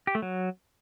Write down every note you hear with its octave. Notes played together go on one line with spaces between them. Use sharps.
G4
A3
F#3